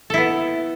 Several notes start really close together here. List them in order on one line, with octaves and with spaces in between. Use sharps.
A4 E4 B3